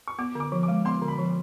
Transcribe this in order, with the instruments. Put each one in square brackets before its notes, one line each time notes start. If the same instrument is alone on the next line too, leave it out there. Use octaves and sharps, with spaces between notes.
[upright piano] C#6
[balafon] B3 [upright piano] D6
[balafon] D3 [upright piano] D6
[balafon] F3
[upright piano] D6
[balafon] G#3
[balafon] B3 [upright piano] C6
[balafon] D3
[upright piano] B5
[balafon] F3